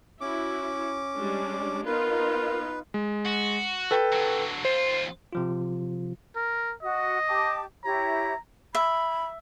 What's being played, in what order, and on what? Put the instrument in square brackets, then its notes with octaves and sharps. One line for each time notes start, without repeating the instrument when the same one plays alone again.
[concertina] C#4 D6 [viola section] E4 F#4
[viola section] G3 G#3 D4
[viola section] B3 D#4 F4 [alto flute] A#4 [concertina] B4
[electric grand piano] G#3
[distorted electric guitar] F#4
[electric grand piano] A4 B4 G5
[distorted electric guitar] D3 F#3
[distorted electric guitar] D#2 F4 [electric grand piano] C5
[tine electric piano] C3 F3 F4
[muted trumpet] A#4
[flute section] F#4 [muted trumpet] D#5
[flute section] G4 A5 D6
[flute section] E4 G4 C#5 [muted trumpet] A#5
[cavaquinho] E5 [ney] B5